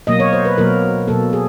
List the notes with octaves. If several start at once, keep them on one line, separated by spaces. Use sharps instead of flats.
B2 F#3 A#3 D#5
C#5
C5
B4
B2 F#3 A#3 A#4
B2 F#3 A#3 A4
G#4